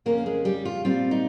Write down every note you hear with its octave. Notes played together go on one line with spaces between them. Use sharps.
F2 C#3 G#3 A#3 C#4 A#4
G#3 G#4
G3 G4
F4
A#2 G3 C4 F4
D#4